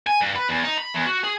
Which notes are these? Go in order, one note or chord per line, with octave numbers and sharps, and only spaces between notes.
G#5
G2
B4
E2
D#4
B5
E2
F#4
G#4